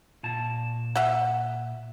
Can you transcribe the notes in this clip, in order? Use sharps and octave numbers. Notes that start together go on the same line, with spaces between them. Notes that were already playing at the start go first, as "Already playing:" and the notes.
A#2 A5
E5 F#5